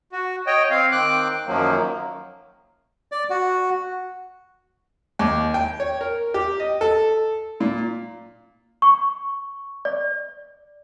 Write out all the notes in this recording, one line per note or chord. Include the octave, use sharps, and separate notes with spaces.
F#4
C#5 D#5 G5
C4 F5
D#3 C4 G5 D6 F#6
F#2 D#3 F3 F#3 A#3
D5
F#4
D#2
G5
C#5
A#4
G4
D#5
A4
A#2
C#6
D5